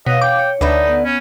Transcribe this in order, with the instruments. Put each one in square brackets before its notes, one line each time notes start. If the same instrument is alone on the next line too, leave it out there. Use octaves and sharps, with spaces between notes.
[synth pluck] B2 [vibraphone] C#5 F5 [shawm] D#5
[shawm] G5 [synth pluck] D6
[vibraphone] C#5
[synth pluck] D2 [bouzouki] D3 B4 E5 [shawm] D#4
[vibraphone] B3 F#5
[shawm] C#4